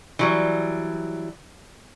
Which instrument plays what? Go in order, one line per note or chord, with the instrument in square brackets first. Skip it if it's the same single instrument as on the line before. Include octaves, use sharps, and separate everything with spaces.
[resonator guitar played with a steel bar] E3 F#3 G3